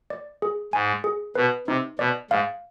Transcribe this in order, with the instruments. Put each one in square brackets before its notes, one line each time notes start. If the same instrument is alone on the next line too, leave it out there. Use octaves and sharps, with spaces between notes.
[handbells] D5
G#4
[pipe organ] G#2 [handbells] G#5
[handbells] G#4
[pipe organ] B2 [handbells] B4
[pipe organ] C3 [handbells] D#4
[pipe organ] B2 [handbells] D5
[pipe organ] G#2 [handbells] F5